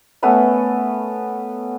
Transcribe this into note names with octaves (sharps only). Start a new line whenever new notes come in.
A3 B3 C#4 B4